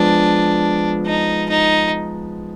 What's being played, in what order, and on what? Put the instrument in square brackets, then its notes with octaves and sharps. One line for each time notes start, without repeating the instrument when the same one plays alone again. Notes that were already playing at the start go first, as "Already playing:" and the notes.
Already playing: [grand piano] F3 G#3 B3 [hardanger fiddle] D4
[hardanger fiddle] D#4
D#4